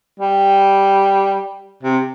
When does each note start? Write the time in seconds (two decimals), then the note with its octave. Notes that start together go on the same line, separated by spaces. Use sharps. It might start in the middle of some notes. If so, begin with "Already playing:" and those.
0.20 G3
1.83 C3